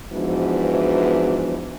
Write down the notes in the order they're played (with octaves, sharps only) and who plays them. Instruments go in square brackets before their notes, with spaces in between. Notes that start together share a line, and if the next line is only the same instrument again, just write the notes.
[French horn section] G#2 E3 F3 B3 D4 F#4